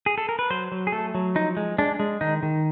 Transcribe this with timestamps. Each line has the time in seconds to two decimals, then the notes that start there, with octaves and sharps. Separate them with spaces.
0.06 G#4
0.18 A4
0.29 A#4
0.39 B4
0.50 F#3 C5
0.72 F#3
0.87 G#4
0.92 A3 A4
1.15 F#3
1.35 F3 D#4
1.57 G#3
1.78 G#3 D4
2.00 G#3
2.21 D#3 D#4
2.43 D#3